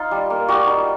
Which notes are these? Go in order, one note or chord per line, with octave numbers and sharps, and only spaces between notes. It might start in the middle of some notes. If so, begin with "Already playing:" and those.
Already playing: D#4 F4
G3
A#3
G3 F#4
D#4